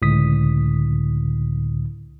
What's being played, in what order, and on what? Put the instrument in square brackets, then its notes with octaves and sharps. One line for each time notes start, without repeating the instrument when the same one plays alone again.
[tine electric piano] C#2 A2 D3 D#6 B6